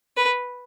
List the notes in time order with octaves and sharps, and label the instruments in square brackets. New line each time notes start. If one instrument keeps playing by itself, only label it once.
[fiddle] B4